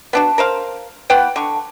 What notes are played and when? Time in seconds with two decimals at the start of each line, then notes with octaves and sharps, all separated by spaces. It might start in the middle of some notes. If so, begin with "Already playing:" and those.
0.13 B3 D4 F#4
0.38 A#4 C5 F5
1.10 E3 B3 F#5 G5
1.36 D3 C#6